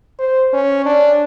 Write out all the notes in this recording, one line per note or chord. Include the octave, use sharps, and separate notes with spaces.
C5
C#4
D4